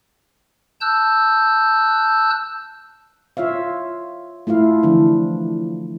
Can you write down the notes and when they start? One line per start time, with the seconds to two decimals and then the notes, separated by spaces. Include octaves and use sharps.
0.81 A5 E6 F#6 G6
3.37 F4 C#5 E5 F5
4.47 A3 E4 F4 F5
4.83 D3 E3 F3 D4